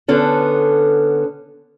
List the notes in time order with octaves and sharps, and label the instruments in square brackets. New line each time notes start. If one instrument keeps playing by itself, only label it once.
[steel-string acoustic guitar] D3 B3 C#4 A4